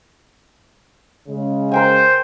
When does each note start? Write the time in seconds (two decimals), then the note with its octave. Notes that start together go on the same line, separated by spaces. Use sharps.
1.28 C#3 G#3
1.72 A#4 C5 G5 G#5